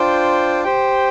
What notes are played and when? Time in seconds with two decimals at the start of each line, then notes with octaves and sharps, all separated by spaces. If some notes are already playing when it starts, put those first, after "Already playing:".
Already playing: D4 F4 C5 G5
0.64 G4 C5 G5